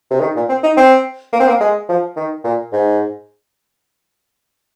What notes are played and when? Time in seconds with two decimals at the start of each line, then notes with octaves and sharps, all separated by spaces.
0.11 C3
0.21 D#3
0.36 A#2
0.49 C4
0.63 D#4
0.77 C4
1.33 A#3
1.40 C4
1.48 A#3
1.61 G#3
1.89 F3
2.16 D#3
2.44 A#2
2.73 G#2